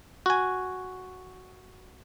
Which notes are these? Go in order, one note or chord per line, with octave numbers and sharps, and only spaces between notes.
F#4 G#5